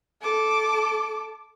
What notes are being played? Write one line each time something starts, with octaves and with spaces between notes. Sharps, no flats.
A4 D6